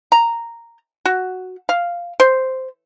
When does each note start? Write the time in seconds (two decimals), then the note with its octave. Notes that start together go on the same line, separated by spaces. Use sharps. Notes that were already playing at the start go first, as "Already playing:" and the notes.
0.12 A#5
1.05 F#4
1.69 F5
2.20 C5